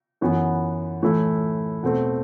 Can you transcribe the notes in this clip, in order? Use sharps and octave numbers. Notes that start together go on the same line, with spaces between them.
F#2 E3 B3 F#4
A2 E3 A3 E4
E2 B2 A3 C4